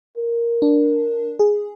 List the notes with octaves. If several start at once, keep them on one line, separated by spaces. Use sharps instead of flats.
A#4
D4
G#4